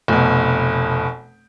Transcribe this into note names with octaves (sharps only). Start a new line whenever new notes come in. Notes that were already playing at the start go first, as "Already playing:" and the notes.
F1 B2